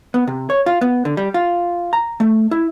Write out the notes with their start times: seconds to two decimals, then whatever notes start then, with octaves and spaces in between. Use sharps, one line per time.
0.14 B3
0.28 C3
0.50 C#5
0.66 F4
0.81 B3
1.05 D3
1.17 G3
1.34 F4
1.93 A#5
2.20 A3
2.51 E4